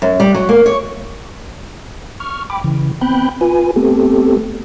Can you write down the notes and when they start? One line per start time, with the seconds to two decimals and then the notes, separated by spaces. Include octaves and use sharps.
0.02 F#2
0.20 G3
0.34 F#3
0.49 A#3
0.66 C#5
2.20 C#6 F6
2.50 G5 B5 D6
2.64 C#3 E3
3.01 B3 C4 G5 B5 F#6 G6
3.41 F4 B4 G#5
3.76 A3 B3 C4 G4 A4